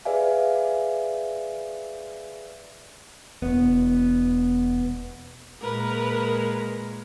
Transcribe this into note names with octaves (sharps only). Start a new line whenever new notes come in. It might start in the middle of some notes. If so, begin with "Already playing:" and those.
G#4 B4 D5 E5 F5 G#5
E1 B3
A#2 G#3 A#4 B4